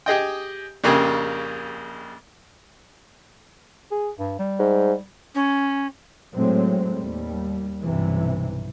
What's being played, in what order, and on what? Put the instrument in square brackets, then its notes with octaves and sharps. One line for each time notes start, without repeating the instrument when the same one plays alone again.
[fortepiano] G4 G#4 D#5 G5
A#1 F2 C#3 A#3 G4 G#4
[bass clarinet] G#4
G2
G3
[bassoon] G#2
[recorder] C#4
[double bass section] A2 F#3 G#3 C4
D#2 G3
B1 G2 C3 E3